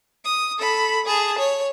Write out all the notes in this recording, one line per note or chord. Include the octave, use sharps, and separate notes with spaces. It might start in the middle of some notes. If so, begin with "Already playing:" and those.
D#6
A4 B5
G#4 A5
C#5